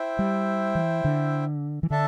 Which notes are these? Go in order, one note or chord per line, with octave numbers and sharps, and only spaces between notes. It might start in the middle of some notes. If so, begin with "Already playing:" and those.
Already playing: E4 C5 E5 G5
G3
E3
D3
E3
D3 D4 A4 E5 A5